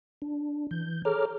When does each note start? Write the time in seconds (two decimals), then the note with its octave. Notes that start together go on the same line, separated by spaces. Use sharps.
0.22 D4
0.71 E3 G6
1.05 G#4 A4 C#5 A#5 D6 F6